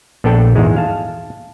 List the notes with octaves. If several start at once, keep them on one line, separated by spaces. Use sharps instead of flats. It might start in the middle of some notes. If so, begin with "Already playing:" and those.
A#1 B3 D4 A4 G5
E2 G#2 G#3
F5 A5